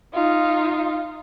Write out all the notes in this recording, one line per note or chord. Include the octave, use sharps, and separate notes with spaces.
D#4 F4